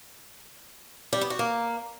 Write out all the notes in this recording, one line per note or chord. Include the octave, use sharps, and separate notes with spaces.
G3
B3
F#4
A#3